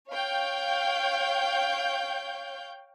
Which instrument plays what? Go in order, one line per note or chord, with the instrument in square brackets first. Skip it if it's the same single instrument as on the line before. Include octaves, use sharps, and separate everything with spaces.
[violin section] C#5 F5 G5 G6